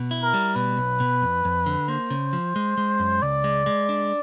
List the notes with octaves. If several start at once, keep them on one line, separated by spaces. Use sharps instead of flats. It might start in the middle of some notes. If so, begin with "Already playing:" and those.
Already playing: B2
E4
A#4
G3
B2 B4
B1
B2
F2
F2
D3
A#3 C5
C#3
F3
G#3
G#3
F#2
C#2 D5
G#3
G#3
D4